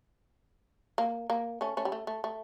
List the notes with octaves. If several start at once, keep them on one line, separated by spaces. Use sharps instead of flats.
A#3
A#3
A3 C#4
A3 C#4
G3
A3
A3
A3